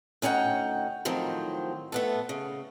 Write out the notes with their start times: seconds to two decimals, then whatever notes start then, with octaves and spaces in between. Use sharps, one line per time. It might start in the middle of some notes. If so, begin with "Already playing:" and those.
0.22 D2 C#4 D#4 F#5 G5
1.05 A2 D#3 F3 F#3 C4
1.92 A3 B3 A4
2.29 C#3